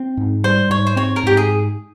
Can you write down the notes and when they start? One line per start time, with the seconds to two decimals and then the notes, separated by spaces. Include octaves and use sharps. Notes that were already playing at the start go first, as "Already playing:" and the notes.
Already playing: C4
0.17 G#2
0.44 G3 C5
0.70 G#2 C#5
0.87 C5
0.96 C4 C#5
1.16 A#4
1.23 G#2 G4
1.37 G#4